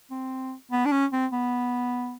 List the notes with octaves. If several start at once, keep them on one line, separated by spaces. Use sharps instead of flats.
C4
B3
D4
C#4
C4
B3